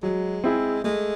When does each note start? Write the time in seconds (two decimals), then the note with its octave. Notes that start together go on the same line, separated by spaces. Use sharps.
0.03 F#3 G#3
0.44 C4 E4 G#4
0.84 G#3 A3